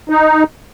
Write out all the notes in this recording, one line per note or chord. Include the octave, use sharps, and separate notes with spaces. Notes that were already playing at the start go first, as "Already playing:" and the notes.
D#4